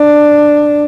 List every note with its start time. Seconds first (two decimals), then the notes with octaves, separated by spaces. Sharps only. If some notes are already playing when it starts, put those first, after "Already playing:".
Already playing: D4